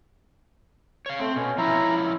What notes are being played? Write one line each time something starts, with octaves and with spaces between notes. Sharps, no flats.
C#5 F5
A3 C4
B2 C#4
F3 C#4 E4 E5 A#5